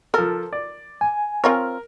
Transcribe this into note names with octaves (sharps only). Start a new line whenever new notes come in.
F3 A4 A#4
D5
G#5
C4 F4 A#4 C#5